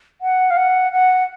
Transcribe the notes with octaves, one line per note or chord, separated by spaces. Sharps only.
F#5
F5
F#5
F#5